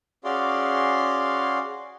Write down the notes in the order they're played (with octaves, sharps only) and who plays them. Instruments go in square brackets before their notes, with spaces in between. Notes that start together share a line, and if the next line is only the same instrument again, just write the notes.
[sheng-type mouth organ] C#4 F#4 G#4 D5 F5 C6